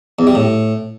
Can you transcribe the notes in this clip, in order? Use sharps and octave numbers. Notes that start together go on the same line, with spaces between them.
E2
G3
A2